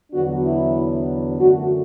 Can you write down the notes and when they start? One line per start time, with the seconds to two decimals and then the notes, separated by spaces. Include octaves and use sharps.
0.12 E2 D3 F#3 B3 D4 F#4
0.44 E4
1.40 F#2 D3 A3 F#4